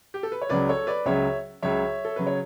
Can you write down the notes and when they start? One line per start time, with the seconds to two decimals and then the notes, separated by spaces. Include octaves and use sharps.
0.14 G4
0.23 A4
0.32 B4
0.42 C#5
0.49 C#2 C#3 F#3 B4 D5
0.69 A4 C#5
0.87 B4 D5
1.06 C#2 C#3 F#3 C#5 E5
1.62 C#2 C#3 F#3 C#5 E5
2.05 A4
2.16 C#3 F#3 B4
2.27 C#5